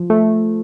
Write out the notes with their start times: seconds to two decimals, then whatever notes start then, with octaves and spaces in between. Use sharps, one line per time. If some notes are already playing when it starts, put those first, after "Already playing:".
Already playing: F3
0.10 A3